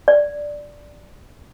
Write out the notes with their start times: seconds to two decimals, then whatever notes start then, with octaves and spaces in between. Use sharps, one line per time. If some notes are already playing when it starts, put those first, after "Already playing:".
0.08 D5